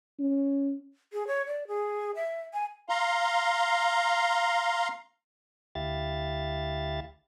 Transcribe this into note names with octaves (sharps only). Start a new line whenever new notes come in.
C#4
G#4
C#5
D5
G#4
E5
G#5
F5 A#5 C6
D2 E4 G4 E5 F5 A6